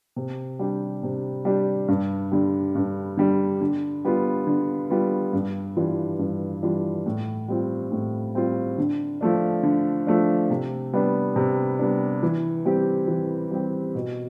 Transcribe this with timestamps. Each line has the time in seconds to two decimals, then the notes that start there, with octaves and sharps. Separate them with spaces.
0.16 C3
0.59 G3 D4 G4
1.03 C3
1.45 G3 D4 G4
1.88 G2
2.32 D3 G3
2.75 G2
3.17 D3 G3
3.61 D3
4.05 G3 B3 F4
4.47 D3
4.90 G3 B3 F4
5.33 G2
5.77 E3 G3 D4 F4
6.19 G2
6.63 E3 G3 D4 F4
7.06 A2
7.48 G3 C4 F4
7.92 A2
8.35 G3 C4 F4
8.78 D3
9.21 F3 A3 D4
9.63 D3
10.07 F3 A3 D4
10.50 C3
10.93 G3 B3 D4
11.36 C3
11.79 G3 B3 D4
12.23 E3
12.65 G3 C4 G4
13.08 E3
13.51 G3 C4 G4
13.95 B2